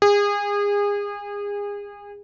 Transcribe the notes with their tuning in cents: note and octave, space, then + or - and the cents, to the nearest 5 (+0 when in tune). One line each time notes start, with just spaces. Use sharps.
G#4 -30